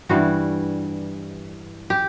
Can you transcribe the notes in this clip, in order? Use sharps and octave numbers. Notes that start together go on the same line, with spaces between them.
G2 E3 G3 F#4
G4